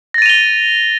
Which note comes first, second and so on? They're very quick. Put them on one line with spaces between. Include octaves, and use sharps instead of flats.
A#6 A6 D#7 F7 G7